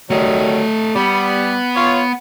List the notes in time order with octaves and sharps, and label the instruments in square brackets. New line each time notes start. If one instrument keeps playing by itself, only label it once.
[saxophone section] D#3 F#3 G3 [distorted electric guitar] A3 D#5
[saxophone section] G3 [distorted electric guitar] B3
[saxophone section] F4 C#5